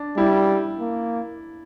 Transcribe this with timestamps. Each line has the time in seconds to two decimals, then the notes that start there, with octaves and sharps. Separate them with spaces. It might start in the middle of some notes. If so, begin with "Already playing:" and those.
Already playing: D4
0.17 G3 E4
0.80 A#3